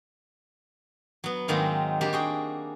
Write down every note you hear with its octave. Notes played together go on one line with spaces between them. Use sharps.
F#3 B3
G#2 D#3 F#3 G#3 A#3 C4
G3 A#3 D4 G4
F#4 G#4 G5